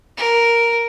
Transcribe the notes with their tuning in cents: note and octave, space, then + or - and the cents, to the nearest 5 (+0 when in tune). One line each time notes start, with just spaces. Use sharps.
A#4 +0